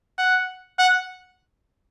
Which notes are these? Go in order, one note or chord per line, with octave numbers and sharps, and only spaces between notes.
F#5
F#5